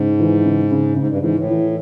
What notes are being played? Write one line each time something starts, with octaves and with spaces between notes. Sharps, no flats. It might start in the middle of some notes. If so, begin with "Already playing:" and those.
Already playing: G#2 C#3
E3
C#3
C#3
G#2 C#3
G2
G#2 E3
A2
E3